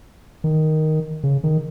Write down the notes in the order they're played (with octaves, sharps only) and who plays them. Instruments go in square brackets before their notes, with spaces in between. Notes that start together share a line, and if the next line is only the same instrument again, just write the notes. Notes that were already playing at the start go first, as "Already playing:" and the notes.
[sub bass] D#3
C#3
D#3